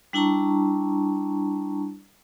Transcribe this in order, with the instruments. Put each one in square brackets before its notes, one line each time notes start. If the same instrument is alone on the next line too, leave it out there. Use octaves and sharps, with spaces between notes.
[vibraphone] G3 D4 E4 A5 A#5 C#6